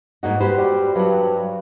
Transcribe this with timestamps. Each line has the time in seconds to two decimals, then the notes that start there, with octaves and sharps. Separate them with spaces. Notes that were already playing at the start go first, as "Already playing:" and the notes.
0.23 G#2 A#3 D#4 F#4
0.40 F#4 G4 B4 C5
0.58 G3
0.95 G2 F#3 F#4